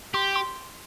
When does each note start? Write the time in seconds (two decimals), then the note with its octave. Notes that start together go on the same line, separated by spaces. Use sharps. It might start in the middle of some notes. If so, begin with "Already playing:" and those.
0.14 G4 C6
0.36 C6